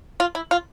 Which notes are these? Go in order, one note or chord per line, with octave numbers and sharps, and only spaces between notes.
F4
E4
F4